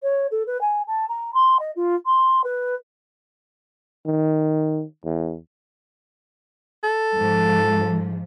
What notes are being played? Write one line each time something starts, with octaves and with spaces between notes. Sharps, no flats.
C#5
A4
B4
G#5
A5
A#5
C6
D#5
F4
C6
B4
D#3
E2
A4
G#2 F3